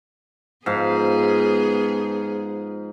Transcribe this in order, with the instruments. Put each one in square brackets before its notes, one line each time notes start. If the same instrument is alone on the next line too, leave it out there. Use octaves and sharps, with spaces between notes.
[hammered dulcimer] G#2 F3 F5 [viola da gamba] B3 G#4